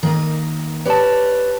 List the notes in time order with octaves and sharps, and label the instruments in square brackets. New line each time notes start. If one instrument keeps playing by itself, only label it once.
[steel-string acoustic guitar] D#3 A#3 D#5
[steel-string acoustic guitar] G4 C#5 D5 [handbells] B4 A5